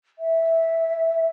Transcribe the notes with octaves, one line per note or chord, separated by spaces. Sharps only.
E5